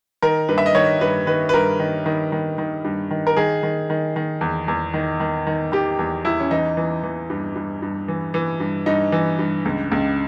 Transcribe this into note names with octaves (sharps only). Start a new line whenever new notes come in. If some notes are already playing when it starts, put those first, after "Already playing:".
D#3 A#4
G2 B4
E5
D#5
D#3 C#5
G2 B4
D#3 B4
B4
G2 A#4
D#3
D#3
D#3
D#3
G2
D#3
A#4
D#3 G#4
D#3
D#3
D#3
E2
E2
D#3
D#3
D#3
D#3 G4
E2
E2 E4
C#4
E3 D#4
E3
E3
G2
G2
G2
E3
E3
G2
G2 D#4
E3
G2
C#2
C#2